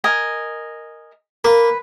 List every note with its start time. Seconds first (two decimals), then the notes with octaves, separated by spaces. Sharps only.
0.04 A#4 D#5 G#5
1.44 A#3 B4